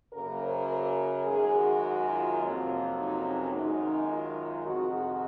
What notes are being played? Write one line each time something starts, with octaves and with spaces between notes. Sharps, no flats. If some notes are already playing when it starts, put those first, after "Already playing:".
F#2 C#3 F#3 A#3 A#4
C5
A#4
F#2 D#3 G#3 G#4
F#4
F4
F2 C3 F#3 A#3
D#4
C#4
F#2 D#3 G#3 D#4
F4
F2 C3 D#3 G#3 F#4
F#4